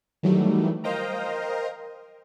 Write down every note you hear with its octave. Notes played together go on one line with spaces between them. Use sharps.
D#3 E3 F#3 G3 A3
A#4 C5 D#5 F5 G5 A#5